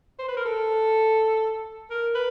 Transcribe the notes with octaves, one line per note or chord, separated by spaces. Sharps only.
C5
B4
A#4
A4
A#4
B4